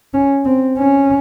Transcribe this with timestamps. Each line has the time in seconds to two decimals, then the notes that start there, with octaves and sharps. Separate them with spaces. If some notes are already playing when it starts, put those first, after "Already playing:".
0.14 C#4
0.45 C4
0.77 C#4